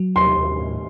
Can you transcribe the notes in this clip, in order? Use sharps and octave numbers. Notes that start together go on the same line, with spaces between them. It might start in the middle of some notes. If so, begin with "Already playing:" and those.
Already playing: F#3
D#2 C6
D#2
A2